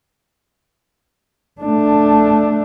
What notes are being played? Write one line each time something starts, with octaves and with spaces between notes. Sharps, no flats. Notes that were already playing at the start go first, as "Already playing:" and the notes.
A3 D4